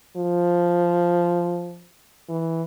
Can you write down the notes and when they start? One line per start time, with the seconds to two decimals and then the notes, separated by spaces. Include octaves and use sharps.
0.17 F3
2.29 E3